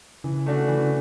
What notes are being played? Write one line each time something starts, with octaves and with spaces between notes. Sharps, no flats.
C#3 E3
A3 D4 F#4
E3